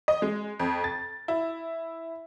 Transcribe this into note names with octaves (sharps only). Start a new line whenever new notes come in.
D#5
G#3
F2
A6
E4